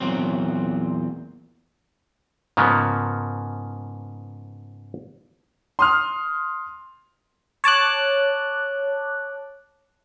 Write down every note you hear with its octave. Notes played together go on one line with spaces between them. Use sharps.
E2 A#2 F#3 C4
G#2 C#3 F3 A#3 B3
C6 D#6 F6
C#5 A5 D6 F#6